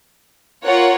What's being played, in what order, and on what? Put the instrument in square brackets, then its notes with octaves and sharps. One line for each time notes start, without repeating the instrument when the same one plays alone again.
[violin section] F4 A#4 C#5 F#5